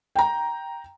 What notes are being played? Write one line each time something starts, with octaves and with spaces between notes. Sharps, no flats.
G5 A#5